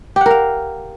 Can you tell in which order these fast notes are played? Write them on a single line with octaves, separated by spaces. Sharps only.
G4 F#5 A#4 F5